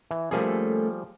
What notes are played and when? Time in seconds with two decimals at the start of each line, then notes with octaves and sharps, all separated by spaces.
0.11 E3
0.31 F3 G3 A3 A#3 C#4 G#4